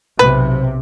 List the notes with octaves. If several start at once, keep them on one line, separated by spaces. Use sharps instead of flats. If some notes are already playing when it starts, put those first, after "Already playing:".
B1 C3 B4